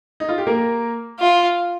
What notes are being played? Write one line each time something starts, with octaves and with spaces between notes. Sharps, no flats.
D#4
F4
G4
A#3 A#4
F4